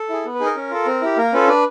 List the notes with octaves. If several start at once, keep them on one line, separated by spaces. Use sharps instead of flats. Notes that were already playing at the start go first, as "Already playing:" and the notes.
Already playing: A4
E4 G#4
B3
B4
D#4 G#4
A#4
C#4
F4 A4
C4
E4 G4
A#3 A#4
C#4 F4 A4 B4
D4 B4